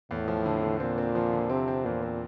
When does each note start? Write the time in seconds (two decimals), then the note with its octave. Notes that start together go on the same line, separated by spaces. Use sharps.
0.11 E2 A2
0.28 F3
0.46 D3
0.63 D3
0.80 A#2 C4
0.98 C4
1.15 F3
1.33 D3
1.50 C3 C4
1.68 C4
1.85 E2 A#2
2.02 C4